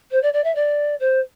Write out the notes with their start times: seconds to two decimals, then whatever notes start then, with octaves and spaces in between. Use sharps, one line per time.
0.11 C5
0.22 D5
0.33 D5
0.44 E5
0.55 D5
1.00 C5